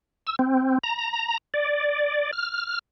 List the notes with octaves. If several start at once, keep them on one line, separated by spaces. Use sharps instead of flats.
E6
C4
A#5
D5
F6